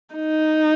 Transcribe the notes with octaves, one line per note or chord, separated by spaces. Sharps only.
D#4